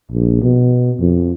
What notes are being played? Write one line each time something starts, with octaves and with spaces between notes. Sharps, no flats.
A#1
B2
F2